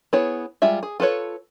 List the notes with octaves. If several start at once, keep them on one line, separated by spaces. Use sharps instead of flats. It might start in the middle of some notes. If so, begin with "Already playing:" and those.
B3 E4 G#4 C#5
G3 G#3 F4 E5
G#4
F4 A4 B4 C#5